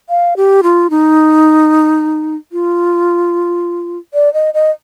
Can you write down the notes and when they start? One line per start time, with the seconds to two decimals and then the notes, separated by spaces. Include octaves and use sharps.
0.09 F5
0.37 G4
0.63 F4
0.90 D#4
2.52 F4
4.14 D5
4.33 D#5
4.54 D#5